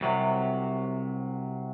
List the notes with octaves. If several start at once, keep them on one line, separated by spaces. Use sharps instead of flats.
C2 C3 F#3